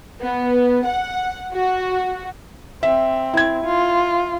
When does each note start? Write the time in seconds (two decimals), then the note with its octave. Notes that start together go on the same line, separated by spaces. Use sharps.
0.23 B3
0.86 F#5
1.54 F#4
2.83 C4 E5
3.34 E4 G#6
3.65 F4